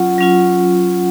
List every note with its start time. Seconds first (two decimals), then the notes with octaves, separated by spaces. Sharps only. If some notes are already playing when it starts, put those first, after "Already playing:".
Already playing: F#3 C#4 F4 F#5
0.18 F#3 C#4 F4